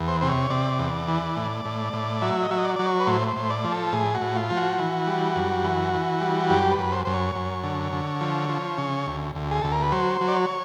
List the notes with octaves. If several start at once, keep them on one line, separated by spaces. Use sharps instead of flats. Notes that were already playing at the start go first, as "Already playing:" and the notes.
Already playing: E2
C5
C3 C5
C#5
C3 D5
E2
E3
A2
A2
A2
F#3 E5
D#5
F#3 E5
D#5
D5
F#3 D5
C#5
B4
A2 C5
C5
A2
D5
F3
A4
A2 G#4
F#4
A2
F4
F3
F#4
E3
G3
F#2
E3
E3
G3
F#2 G4
B4
F#2
C5
F#2 C5
C#5
F#2
D3
D3
F3
F3
C#3
D2
D2
G#4
D2 A4
A#4
B4
F#3 C5
F#3
D5
C#5